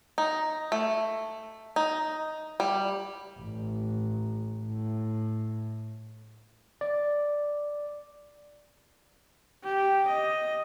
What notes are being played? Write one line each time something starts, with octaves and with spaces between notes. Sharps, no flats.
D#4
A3
D#4
G3
A1
A2
D5
G4
D#5